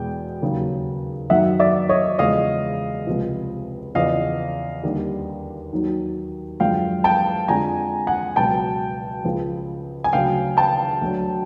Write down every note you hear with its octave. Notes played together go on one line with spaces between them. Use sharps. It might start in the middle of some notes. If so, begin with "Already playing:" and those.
Already playing: E2 B2 G#3 G5
D#2 C#3 F#3
F#2 D#3 F#3 E5 F#5
D5 E5
C#5 D#5
E2 C#3 F3 G#3 D#5 F5
C#2 C3 F3
E2 C#3 F3 D#5 F5
D#2 D3 G3
D#2 D#3 F#3
F#2 D3 F3 G#3 F5 G5
G5 A5
F2 D3 F3 G#3 G#5 A#5
F#5 G#5
C#2 B2 F#3 G5 A5
C#2 C#3 F3 G#3
G#5
D2 C#3 F#3 F5 G5
G5 A5
D2 D3 F#3